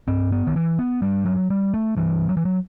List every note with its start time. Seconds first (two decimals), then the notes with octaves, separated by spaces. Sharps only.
0.08 G2 C4
0.32 B3
0.47 D#3
0.56 E3
0.79 B3
1.02 G2 G3
1.26 F#3
1.50 G3
1.74 A3
1.97 G2 E3
2.29 F#3
2.37 E3
2.45 F#3